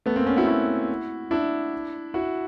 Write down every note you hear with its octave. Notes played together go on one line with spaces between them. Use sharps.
A3 B3
A#3 C4
B3 C#4
E4 F#4
E4 F#4
D4 E4
E4 F#4